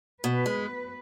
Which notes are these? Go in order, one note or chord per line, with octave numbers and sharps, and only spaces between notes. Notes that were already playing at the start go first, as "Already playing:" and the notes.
B2 B4
G#3